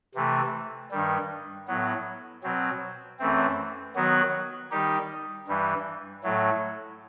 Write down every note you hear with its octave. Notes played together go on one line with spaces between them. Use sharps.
C3 E3 A3
G2 D#3 G3
A2 F#3 B3
B2 F#3 C4
F#2 E3 A3 C4
D#3 F#3 B3 F#4
D#3 G3 D#4 G4
G2 E3 G3
A2 F#3 A3